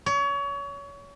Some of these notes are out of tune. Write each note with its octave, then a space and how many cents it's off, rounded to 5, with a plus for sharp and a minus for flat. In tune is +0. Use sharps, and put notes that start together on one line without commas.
C#5 +30